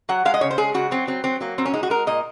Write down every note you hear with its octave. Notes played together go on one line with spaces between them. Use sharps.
F#3 F#5
G#3 F5
D#5
C#3 C#5
C5
G#3 G#4
C#3 F#4
F#3 C4
F#3 C4
F#3 C4
F#3 A#3
A#2 C4
C#4
G#3 D#4
F#4
G#3 A#4
A#2 D#5